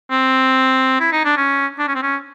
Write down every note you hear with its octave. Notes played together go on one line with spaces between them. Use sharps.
C4
E4
D#4
D4
C#4
D4
C#4
C4
C#4